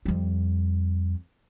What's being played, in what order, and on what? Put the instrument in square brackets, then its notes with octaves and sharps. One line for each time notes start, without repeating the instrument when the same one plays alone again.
[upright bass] F2 G3